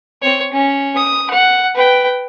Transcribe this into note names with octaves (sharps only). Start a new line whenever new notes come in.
C4 C#5
C#4
D#6
F#5
B4 G5